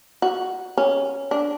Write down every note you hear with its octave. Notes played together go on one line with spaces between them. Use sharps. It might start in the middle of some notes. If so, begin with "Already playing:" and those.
F#4
C#4
D4